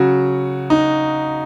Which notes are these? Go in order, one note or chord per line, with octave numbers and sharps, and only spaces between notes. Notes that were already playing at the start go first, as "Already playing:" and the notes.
Already playing: C#3 F#3 F#4
D#4